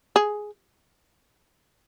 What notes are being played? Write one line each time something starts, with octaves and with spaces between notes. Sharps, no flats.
G#4